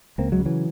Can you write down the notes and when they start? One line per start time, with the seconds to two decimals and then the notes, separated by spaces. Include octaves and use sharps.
0.18 C#2 A#3 C4
0.32 F#3 G#3
0.39 C#3
0.45 E3 F#3